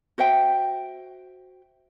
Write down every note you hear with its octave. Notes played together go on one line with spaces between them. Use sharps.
F#4 C5 E5 G5